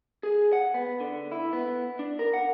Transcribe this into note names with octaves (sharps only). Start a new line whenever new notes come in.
G#4
F#5
B3
D3
E4
B3
D4
A#4
F#5